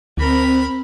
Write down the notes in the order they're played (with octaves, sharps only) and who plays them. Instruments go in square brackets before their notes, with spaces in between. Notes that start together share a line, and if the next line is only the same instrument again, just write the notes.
[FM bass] D2 [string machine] C4 [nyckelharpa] A#4 B5